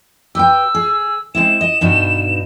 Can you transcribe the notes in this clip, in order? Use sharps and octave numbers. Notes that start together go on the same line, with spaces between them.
G4 B4 G5 E6
G#4
G#3 C4 E4 E7
D#5
G2 B2 D#4